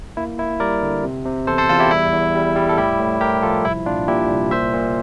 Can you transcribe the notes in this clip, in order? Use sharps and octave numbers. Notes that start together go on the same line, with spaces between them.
A#3 E4
A#3 E4
G3 A#4 D5
D3
C3
C3
E2 A4 C5
A4 C5
E2 F4 A4
E4 G4
G3 E4
E2
G3
G3
A4
A2 E4 G4
A2
A2 G4 A#4
F3 F4 A4
C2 E4
A#2 D4 F4
A#2 E4 G4
C2
A#2 C5 E5
A#2